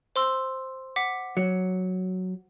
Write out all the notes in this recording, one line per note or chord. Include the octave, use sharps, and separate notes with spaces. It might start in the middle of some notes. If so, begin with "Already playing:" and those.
C5 C6 E6
F#5 D6 B6
F#3 C#7